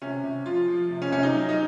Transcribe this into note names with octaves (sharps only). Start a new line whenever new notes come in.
C3 C#4
C3
F3 F4
F3
C3
C#4
C3 C#4
D#4
F#3
D#4